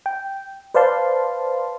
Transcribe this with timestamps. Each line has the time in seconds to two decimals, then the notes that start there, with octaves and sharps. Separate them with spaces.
0.06 G5
0.74 B4 C5 D5 F5 A5 C6